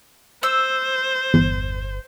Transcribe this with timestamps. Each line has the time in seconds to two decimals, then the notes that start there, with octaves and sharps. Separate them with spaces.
0.43 C5 E6
1.34 G1 E2